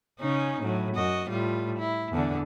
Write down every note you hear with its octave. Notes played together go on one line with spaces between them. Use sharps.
C#3 C#4 D#4
A2 F#3
F#2 F#4 D#5
A2 G3 F4
E4
E2 D3 D4